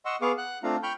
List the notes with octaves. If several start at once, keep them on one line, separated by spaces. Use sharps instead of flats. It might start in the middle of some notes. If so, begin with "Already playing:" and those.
D#5 F#5 C6 C#6 E6
B3 G#4 F5 C#6 D6
F#5 F#6
A3 C4 D4 F4 F5 A#5
G5 B5 C#6 F6 G6